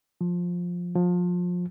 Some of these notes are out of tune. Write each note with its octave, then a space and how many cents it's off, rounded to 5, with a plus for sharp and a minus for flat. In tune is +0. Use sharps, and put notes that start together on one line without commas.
F3 +10
F3 +25